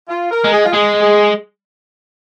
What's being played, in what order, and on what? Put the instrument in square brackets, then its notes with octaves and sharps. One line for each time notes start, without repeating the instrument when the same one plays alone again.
[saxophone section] F4
A#4
[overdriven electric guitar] G#3
[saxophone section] G#4
F4
[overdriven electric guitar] G#3 [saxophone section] G#4
[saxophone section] G#4